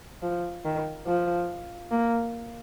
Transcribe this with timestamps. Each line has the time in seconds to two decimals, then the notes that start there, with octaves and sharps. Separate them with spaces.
0.22 F3
0.65 D#3
1.07 F3
1.91 A#3